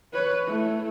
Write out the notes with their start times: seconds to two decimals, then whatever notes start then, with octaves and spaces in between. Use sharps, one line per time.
0.13 B4 C#5
0.46 A3 E4